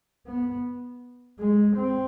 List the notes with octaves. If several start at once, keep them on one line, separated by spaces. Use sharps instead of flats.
B3
G#3
C4